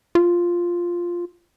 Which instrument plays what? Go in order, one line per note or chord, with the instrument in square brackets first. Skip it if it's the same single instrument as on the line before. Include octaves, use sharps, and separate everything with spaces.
[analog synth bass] F4